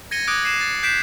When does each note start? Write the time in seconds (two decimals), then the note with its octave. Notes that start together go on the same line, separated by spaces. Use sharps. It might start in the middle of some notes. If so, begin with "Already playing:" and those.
0.11 G#6 A#6 C#7 D#7 G7
0.27 D6 D#6 F#6 G#6 D7
0.45 C7 D#7 E7
0.61 A6
0.83 F#6 G6 B6 C7 D7 E7